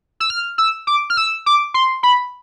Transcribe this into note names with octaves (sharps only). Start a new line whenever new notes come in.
E6
F6
E6
D6
F6
E6
D6
C6
B5